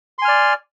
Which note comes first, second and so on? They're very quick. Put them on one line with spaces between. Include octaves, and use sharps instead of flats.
C6 G#5 F6 D5